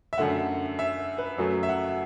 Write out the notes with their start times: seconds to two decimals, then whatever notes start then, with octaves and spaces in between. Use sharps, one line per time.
0.13 E5
0.18 F#2 D3 A3 F#5
0.79 E5
1.18 B4
1.38 F#2 F#3 A3
1.63 E5
1.69 F#5